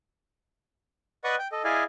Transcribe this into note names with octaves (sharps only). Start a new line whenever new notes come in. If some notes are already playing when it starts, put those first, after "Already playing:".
B4 D5 D#5 F#5 C#6 D#6
G5
A4 D#5
E4 G#4 D5 D#5 F5 G#5